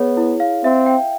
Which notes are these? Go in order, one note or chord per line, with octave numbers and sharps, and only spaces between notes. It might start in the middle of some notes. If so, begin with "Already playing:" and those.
Already playing: B3 G#4 C#5
E4
F5
C4 E5
G5